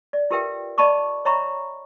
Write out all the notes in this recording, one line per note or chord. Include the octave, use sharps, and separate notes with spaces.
D5
F4 G4 A#4 B4 E5 G5
D5 D#5 A5 B5 C#6 D6
C#5 D#5 E5 A#5 B5 C#6